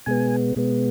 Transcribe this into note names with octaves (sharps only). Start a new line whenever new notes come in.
B2 G#3 B3 G#5
B2 G#3 B3